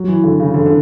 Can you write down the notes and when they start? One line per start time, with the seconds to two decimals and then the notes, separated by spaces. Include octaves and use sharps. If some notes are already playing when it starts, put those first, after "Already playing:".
Already playing: F#3
0.08 E3
0.24 D3
0.40 C#3
0.54 D3
0.66 D3